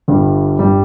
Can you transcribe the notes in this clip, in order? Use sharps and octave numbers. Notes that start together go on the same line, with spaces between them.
G1 G2 G3
G2 G3